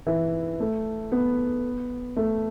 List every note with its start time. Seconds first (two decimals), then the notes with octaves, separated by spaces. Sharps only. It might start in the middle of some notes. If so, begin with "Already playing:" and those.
0.07 E3
0.60 A3
1.12 B3
2.16 A3